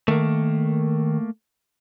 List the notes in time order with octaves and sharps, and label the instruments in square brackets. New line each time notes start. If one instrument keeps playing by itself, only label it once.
[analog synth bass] D#3 [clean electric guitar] A3 A#3